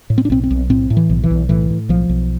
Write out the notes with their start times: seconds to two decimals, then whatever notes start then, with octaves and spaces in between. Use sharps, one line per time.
0.10 A2
0.18 C4
0.25 D4
0.30 B1 C4
0.43 C4
0.50 B1
0.70 A2 C4
0.90 A2
0.97 E3
1.10 B1
1.24 E3
1.30 B1
1.49 A2 E3
1.70 A2
1.89 B1 F3
2.09 B1